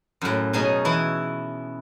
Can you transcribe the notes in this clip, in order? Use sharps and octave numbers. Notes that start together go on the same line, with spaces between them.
F#2 A2
B2 C#4 D#4 G#4
E3 E4